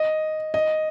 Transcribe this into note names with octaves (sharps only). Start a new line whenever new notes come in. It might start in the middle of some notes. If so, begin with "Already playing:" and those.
Already playing: D#5
D#5